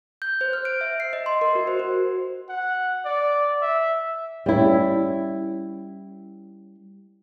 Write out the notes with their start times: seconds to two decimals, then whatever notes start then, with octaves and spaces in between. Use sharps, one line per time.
0.22 G6
0.41 C5
0.53 F6
0.65 D7
0.81 E5
1.00 C7
1.13 D#5
1.26 C6
1.41 A#4
1.55 F#4
1.67 C5
1.79 F#4
2.49 F#5
3.05 D5
3.62 E5
4.46 G3 C#4 E4